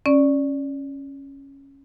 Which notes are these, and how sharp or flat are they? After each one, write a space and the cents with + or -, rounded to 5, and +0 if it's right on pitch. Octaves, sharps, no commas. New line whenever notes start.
C#4 -10 D5 +0